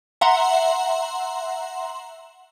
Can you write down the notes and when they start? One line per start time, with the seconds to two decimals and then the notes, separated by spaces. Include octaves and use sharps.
0.21 E5 F#5 A#5 C6